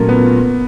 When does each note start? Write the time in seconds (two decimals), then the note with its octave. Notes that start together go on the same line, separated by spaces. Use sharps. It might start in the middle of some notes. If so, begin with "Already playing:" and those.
Already playing: A#2 F#3 A3 A#3 C#4 F4
0.09 B3